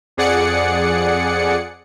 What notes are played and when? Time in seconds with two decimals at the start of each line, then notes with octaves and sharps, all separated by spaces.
0.17 F2 G#4 D5 F#5 C#7